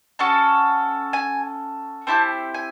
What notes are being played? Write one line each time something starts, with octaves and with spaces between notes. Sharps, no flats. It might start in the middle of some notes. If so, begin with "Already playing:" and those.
C#4 F#4 A4 A5
G#5
C4 E4 G4 A5
G#5